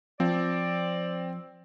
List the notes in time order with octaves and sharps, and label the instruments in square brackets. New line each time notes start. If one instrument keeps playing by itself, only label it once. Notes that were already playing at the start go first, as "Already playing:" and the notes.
[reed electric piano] F3 [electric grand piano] C4 [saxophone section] D5